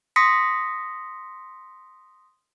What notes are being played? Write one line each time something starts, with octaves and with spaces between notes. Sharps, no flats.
C6 D#6 A#6 B6 C#7